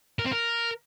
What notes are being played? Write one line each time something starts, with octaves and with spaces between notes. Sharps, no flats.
A#4
C4
A#4